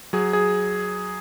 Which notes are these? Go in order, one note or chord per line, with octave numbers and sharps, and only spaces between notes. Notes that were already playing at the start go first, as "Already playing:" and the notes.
F#3 G#4
G#4